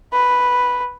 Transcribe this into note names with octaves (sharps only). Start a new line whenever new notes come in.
B4